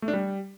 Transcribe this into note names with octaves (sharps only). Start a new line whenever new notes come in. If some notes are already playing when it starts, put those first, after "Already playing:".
A3
D4
G3